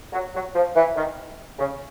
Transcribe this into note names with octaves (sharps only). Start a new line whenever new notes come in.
F#3
F#3
F3
E3
D#3
C#3